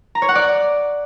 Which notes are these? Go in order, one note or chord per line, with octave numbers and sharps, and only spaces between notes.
A#5
C#5
F#5
D5